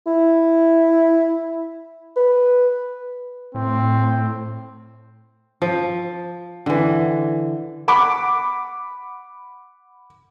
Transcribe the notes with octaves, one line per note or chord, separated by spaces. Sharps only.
E4
B4
A2 C4
F3
D3 E3
F#5 B5 D6